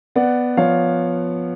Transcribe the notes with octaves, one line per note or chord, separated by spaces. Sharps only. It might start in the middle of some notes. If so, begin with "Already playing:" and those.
B3 D5 F#5
F3 C#5 F5